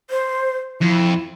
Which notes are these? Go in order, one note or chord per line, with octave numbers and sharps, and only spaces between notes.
C5
F2 E4